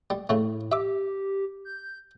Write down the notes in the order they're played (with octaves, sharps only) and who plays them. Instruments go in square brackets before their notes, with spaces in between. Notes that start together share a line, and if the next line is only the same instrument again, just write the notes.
[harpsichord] G3
[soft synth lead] A2 [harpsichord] C#3 A3
[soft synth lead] G4 [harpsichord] E5 D6
[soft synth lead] G6